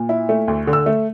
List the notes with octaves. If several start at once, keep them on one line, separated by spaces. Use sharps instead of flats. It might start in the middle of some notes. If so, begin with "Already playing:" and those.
Already playing: A#2
E4
A3
D2
D3
E6
A3